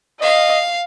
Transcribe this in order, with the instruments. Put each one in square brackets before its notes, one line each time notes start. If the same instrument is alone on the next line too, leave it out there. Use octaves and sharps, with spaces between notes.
[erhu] D#5 [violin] F5